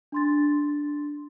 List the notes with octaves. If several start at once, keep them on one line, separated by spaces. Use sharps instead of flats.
D4 C6 A6